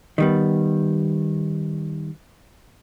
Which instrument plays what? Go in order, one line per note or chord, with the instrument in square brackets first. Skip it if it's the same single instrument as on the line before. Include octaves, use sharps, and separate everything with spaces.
[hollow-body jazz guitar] D#3 G3 B3